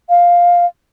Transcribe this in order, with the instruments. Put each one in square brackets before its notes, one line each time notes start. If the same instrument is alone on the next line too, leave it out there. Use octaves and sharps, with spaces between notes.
[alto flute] F5